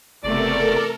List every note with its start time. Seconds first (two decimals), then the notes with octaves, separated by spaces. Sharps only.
0.24 F#1 E2 C3 A3 A4 A#4 D5